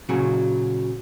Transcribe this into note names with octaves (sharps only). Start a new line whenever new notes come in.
A#2 C#3 F#3